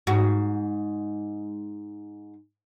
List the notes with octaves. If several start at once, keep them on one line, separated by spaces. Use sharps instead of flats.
G#2 F#4